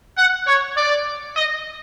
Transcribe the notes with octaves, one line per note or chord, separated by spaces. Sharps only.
F#5
C#5
D5
D#5